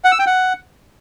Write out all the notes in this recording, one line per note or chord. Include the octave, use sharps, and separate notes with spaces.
F#5
E6
G5
F#5